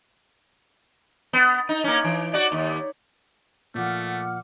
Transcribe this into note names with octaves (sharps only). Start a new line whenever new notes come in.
B3
D#4
A#3 C#4
E3
F#4 D5
D#2
A#2 F3 A3 F#5 D6 F6